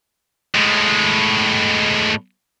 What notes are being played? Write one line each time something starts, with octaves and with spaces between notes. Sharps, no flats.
A2 G#3